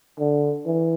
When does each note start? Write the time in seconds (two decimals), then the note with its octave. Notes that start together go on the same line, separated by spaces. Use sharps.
0.19 D3
0.66 E3